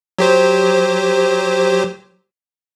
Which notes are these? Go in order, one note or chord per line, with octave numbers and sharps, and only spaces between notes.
F#3 G4 C5